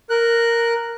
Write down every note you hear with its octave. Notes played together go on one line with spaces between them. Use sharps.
A#4 F#6